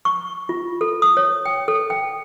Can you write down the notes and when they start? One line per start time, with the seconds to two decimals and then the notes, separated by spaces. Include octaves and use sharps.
0.05 C#6
0.49 F4
0.81 A4
1.02 D#6
1.17 C#5
1.45 G5
1.68 A4
1.90 G5